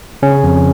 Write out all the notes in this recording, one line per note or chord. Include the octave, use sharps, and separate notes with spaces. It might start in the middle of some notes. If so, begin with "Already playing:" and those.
C#3 C#4
F2